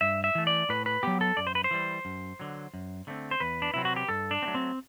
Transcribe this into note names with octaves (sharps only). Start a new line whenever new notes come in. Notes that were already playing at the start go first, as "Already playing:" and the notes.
G2 E5
E5
E3 A3
D5
A2 B4
B4
F#3 B3 G4
A4
F#2 D5
C5
B4
C5
E3 G3
F#2
D3 F#3
F#2
D3 A3 C4
C5
E2 B4
D4
C3 F#3 C4 E4
F#4
G4
G2 A4
D4
C4
F#3 A3
C4